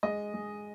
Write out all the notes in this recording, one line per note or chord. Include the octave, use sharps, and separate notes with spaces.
G#3 D#5
G#3